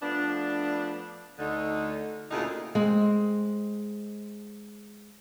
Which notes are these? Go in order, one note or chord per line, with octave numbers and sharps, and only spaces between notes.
F3 A3 B3 D4
D2 D3 D#4
D2 A#2 C#3 D#4 E4 G#4
G#3 C4